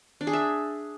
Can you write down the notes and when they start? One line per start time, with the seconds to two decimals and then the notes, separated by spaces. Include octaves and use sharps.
0.21 D4
0.27 G#4
0.33 E5